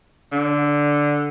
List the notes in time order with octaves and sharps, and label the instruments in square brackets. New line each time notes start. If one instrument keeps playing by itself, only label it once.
[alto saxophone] D3